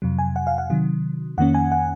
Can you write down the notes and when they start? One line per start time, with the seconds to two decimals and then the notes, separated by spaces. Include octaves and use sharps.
0.02 F2 C3 F#3
0.19 G#5
0.36 F#5
0.47 F5
0.58 F#5
0.70 C3 D#3 F#3
1.38 F2 D#3 A#3 C#4 F#5
1.55 G#5
1.72 F#5